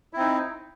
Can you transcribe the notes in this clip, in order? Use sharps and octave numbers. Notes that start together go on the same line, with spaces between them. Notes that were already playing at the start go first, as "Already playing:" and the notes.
C4 D#4 E4